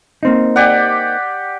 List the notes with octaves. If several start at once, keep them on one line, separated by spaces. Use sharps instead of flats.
A#3 C4 D#4
G4 D5 F#5